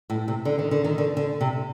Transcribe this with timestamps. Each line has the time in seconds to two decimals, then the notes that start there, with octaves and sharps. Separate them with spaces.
0.10 A2
0.28 C3
0.45 D3
0.59 D#3
0.71 D3
0.84 D#3
0.98 D3
1.17 D3
1.41 C3